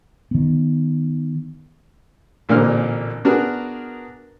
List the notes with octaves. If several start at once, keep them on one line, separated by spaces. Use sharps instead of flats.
D#3 B3
A1 A#2 D3 A#3 C4 F6
B3 D4 F#4 G#4 A#4